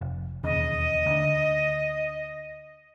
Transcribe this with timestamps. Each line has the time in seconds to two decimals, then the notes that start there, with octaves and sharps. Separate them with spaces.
0.01 F1
0.44 E1 D#2 C#3 D#5
1.06 D2 D3